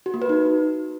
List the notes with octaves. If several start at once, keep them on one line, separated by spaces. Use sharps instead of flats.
F#4
A#3
B4
D#4